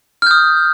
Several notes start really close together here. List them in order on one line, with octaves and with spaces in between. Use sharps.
F6 G6 D#6